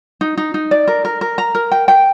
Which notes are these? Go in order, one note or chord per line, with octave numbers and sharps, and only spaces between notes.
D#4
D#4
D#4
D5
A#4
A#4
A#4
A#5
A#4
G5
G5